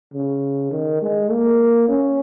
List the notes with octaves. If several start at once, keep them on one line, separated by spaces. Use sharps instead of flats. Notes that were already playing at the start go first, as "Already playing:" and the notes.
C#3
D#3
G#3
A#3
C#4